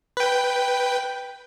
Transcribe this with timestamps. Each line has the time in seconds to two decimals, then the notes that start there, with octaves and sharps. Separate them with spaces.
0.17 B4 G5